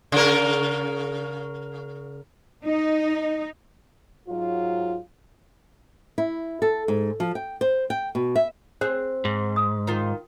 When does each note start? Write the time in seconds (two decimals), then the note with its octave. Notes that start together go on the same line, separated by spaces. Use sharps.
0.12 C#3 A#4
2.66 D#4
4.28 G#2 F#3 F4
6.18 E4
6.62 A4
6.88 G#2
7.20 F3
7.35 G5
7.61 C5
7.90 G5
8.15 B2
8.36 E5
8.81 C4 G#4 C5
9.25 G#2
9.56 D#6
9.87 D#3 F4